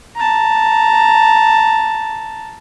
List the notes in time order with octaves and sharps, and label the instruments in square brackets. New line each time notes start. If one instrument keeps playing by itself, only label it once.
[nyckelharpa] A5 A#5